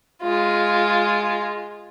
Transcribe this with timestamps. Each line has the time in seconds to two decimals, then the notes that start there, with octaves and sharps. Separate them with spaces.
0.22 G#3 F4